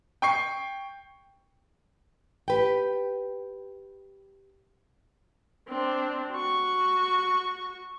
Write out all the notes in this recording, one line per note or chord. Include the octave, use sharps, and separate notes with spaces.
G5 C#6 C7
G4 B4 G5
C4 D4
F#4 C#6